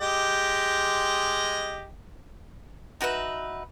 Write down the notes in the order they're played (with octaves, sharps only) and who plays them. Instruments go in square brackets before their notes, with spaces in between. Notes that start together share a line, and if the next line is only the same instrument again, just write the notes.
[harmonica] G#3 G4 D#5
[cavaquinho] D#4 F#4 B4 E5